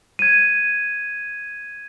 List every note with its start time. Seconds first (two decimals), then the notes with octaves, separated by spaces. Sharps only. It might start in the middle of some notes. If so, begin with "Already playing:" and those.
0.19 G#6 D#7